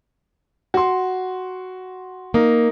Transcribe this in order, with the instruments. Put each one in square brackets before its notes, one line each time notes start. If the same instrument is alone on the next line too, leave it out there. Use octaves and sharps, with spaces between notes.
[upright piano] F#4 C6
[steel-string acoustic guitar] A#3 [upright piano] D#4